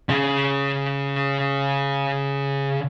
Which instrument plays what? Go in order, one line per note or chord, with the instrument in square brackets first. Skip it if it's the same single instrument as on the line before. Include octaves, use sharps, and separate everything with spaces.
[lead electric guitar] C#3 C#4